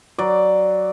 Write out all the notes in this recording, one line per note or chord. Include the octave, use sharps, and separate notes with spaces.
F#3 D5